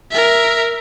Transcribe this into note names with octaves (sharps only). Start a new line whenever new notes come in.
A#4 E5